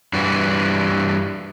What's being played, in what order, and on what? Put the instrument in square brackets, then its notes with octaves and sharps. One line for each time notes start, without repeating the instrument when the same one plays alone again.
[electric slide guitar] G2 E3 F#4